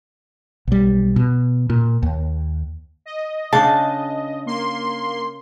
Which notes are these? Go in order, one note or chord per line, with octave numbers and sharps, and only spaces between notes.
B1 G3
B2
A#2
D#2
D#5
C#3 D4 A5
A#3 C6